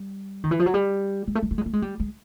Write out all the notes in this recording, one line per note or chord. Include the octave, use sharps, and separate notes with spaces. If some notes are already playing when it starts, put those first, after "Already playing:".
Already playing: G3
D#3
E3
F3
F#3
G3
G#3
A3
G#3
A3
G#3
A3
G#3
G3
G#3